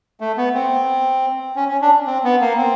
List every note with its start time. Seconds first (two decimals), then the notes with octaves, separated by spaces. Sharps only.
0.20 A3
0.37 B3
0.54 C4
1.56 C#4
1.68 C#4
1.82 D4
2.06 C4
2.24 B3
2.41 A#3
2.57 C4